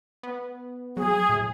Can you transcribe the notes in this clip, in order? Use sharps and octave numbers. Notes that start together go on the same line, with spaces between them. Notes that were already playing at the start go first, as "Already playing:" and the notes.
B3
F#3 G#4
A2